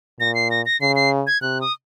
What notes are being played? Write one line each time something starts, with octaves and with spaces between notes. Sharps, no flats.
A#2 A#6
C7
A#6
A#6
C#3 C7
C7
G#6
C3 F#6
D#6